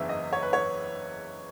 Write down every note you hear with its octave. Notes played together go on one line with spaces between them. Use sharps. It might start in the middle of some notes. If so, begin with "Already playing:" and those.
Already playing: F#1 E2 C#3 E3 E5
D#5
C#5
B4
C#5